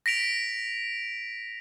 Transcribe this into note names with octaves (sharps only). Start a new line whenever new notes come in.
A#6 B6 D7 F7